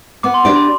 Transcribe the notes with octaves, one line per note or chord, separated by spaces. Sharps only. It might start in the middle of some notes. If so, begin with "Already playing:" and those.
B3 D6
C6
D4 G4 D5
B5